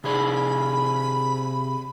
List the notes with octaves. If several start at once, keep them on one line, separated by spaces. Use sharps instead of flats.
C3 G#4 D5 B5